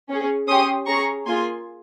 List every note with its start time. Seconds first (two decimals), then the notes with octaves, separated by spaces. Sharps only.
0.09 C#4 G#4
0.48 C#4 G4 C6 D#6
0.87 C#4 G#4 A#5 C#6
1.26 A#3 F4 G#4 G#5 C6